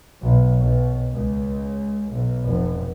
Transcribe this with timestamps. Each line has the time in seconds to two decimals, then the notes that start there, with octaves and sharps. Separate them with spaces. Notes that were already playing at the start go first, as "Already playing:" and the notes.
0.22 B1
0.59 B1
1.13 C#2
2.11 B1
2.43 F1